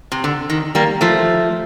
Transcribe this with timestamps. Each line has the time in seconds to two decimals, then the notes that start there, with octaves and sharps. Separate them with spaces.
0.12 C3
0.24 D3
0.50 D#3
0.75 G3 A#3
1.01 F3 A3